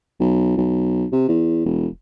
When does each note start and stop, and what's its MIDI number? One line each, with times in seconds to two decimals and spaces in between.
0.20 0.53 35
0.57 1.05 35
1.12 1.27 48
1.28 1.64 40
1.65 1.87 28